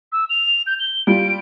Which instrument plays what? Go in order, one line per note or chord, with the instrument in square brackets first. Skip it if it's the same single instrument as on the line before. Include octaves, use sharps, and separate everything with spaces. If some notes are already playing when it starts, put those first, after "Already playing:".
[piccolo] E6
F7
G6
G7
[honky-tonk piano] G3 F4 [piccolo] D7